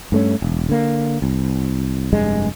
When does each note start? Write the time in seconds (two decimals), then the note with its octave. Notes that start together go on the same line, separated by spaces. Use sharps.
0.12 G2 A3 C#4
0.42 E1
0.69 D3 A#3
1.22 C2
2.13 F1 G2 G#3